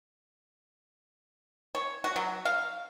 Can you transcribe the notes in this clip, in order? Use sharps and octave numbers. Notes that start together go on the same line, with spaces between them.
C#5
F#4
F#3
F5